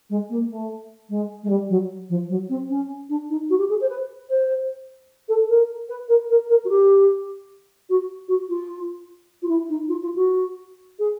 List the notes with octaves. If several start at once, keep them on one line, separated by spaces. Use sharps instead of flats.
G#3
A#3
A3
G#3
G#3
G3
F#3
F3
F#3
C4
C#4
D4
D#4
F#4
G4
G#4
C5
B4
C5
A4
A#4
B4
A#4
A#4
A#4
F#4
G4
F#4
F#4
F4
F4
E4
D#4
F4
F4
F#4
G#4